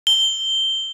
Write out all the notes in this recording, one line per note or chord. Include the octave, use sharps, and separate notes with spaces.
G7